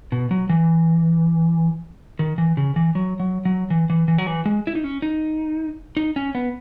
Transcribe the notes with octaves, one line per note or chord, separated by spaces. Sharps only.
B2
F#3
E3
D#3
E3
C#3
E3
F#3
F#3
F#3
E3
E3
E3
F#3
E3
G#3
E4
D#4
C#4
D#4
D#4
C#4
B3